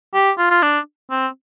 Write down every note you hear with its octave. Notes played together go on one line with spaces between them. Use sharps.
G4
F4
F4
D4
C4